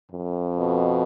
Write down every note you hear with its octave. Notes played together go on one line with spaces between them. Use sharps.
F2
B2